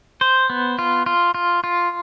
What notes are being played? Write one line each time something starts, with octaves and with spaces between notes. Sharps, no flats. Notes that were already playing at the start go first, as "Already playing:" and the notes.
C5
B3
F4
F4
F4
F4